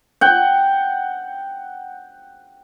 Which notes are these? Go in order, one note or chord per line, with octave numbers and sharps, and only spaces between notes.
F#5 G5